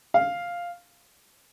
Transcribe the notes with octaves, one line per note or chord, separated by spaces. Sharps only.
F5